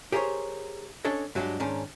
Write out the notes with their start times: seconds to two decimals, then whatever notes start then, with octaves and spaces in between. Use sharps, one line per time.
0.12 G4 G#4 A#4 C5 C#5
1.05 C#4 D4 A4 C#5 D#5
1.35 G2 F#3 G#3 C4 D4 G4
1.60 G#2 D#3 C#4 D4